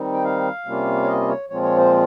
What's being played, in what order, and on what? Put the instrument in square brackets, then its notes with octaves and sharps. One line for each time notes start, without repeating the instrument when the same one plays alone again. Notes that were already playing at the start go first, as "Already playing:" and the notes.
Already playing: [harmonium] D#3 G3 C4 D#4
G5
F5
C3 G3 A#3 C#4 F4
C#5
D#5
C#5
A#2 F3 G#3 C4 F4 C#5
C#5
C5